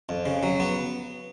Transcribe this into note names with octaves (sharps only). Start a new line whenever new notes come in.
F2
C#3
F#3
B3